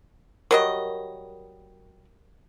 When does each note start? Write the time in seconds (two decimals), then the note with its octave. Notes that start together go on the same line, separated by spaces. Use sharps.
0.51 F#3 G3 G4 A#4 D#5